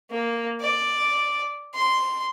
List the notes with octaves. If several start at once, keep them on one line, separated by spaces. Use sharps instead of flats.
A#3
D5
C6